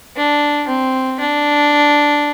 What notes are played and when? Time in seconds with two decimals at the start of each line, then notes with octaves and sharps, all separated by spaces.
0.16 D4
0.68 C4
1.20 D4